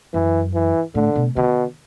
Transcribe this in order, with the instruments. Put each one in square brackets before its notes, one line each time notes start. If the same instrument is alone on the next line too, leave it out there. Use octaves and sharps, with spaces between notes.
[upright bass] F#2 [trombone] E3
[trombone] E3
[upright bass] A2 [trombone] D3
[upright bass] B2
[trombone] B2 [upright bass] D3